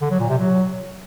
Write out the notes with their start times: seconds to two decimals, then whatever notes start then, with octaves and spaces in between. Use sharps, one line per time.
0.01 D3
0.11 F#3
0.20 A#2
0.29 C3
0.38 F#3